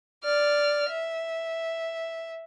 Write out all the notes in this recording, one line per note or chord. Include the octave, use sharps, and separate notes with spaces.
D5 F6
E5